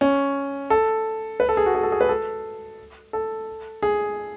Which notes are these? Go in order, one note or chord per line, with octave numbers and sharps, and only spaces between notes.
C#4
A4
B4
A4
G#4
F#4
G#4
A4
G#4
B4
A4
A4
G#4